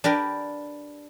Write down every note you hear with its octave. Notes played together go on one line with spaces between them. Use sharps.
D4 G4 A#4 B4